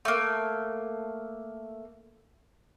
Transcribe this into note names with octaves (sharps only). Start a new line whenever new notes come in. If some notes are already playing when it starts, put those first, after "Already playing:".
A3 A#3